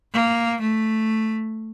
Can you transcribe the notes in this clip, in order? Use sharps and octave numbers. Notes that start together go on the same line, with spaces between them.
A#3
A3